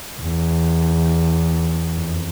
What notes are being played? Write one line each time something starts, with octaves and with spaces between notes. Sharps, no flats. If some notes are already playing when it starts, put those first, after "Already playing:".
E2
F2